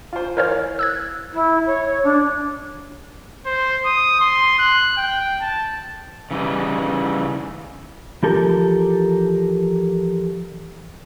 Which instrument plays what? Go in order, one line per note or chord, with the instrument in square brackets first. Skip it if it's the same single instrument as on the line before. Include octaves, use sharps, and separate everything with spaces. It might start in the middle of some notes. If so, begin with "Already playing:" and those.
[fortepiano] F4 C5
[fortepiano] E3 F5 F6 [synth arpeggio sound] A#4 C5 C#5
[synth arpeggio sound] E6 F#6 G#6
[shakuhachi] E4
C#5
D4
[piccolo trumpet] C5
D#6
C6
F#6
G5
A5
[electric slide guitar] C#3 E3 G3 D#4
[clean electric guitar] E3 F3 G4 A4 A#4